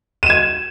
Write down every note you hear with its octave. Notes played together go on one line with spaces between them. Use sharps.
G#6 D#7 E7